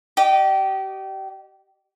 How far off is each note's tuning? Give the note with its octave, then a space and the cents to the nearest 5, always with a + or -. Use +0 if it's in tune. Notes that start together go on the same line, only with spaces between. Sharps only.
G4 -30 D#5 -30